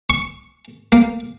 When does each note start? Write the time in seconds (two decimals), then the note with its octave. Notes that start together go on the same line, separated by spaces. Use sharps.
0.10 C#6
0.92 A#3